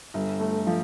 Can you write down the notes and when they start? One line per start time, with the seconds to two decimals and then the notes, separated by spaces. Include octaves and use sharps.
0.14 G1
0.40 A3
0.67 F3